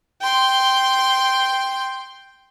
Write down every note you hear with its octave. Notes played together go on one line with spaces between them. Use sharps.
G5 C6